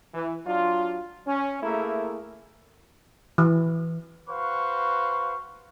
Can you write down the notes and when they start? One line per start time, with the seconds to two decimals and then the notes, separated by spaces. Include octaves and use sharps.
0.14 E3
0.46 F#3 D4 F4
1.26 C#4
1.63 A3 A#3 E4 G#4 A#4
3.38 E3
4.30 F#4 B4 C5 F5 C#6